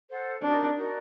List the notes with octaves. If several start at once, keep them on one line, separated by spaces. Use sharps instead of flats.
A4 C5 F#5
D4 D#4 F#4 A#4 D5
D#4 F#4 A#4 D5